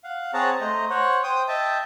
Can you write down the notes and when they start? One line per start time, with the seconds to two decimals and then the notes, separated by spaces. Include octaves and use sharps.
0.04 F5 F#5
0.34 C4 G#4 C#5 F#5 A5 A#5
0.61 A3 C5 D#5 A#5
0.90 C5 C#5 F#5
1.23 C5 G5 D#6
1.48 D#5 E5 G5 A5